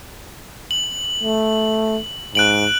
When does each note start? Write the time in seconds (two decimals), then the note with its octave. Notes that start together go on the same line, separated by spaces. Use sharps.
0.71 F#7
1.23 A3
2.35 G#2 F#6 D7 F#7